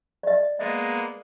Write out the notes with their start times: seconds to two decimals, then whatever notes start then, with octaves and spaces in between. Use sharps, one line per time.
0.23 D5 D#5
0.59 G#3 A#3 B3 D#5